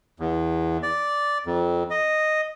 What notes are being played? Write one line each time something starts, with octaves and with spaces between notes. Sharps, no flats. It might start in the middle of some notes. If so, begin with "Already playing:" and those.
E2
D5
F2
D#5